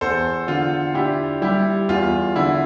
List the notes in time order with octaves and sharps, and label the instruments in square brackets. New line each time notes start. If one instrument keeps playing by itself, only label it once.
[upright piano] E2 [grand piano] A4 C5
[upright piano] D3 [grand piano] F4
[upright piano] D4 [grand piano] E4 G4
[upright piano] G3 [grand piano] E4 G4
[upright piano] E2 [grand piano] F4
[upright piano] D3 [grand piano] E4